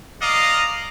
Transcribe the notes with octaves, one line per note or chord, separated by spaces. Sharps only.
D5 D#5 F5 A#5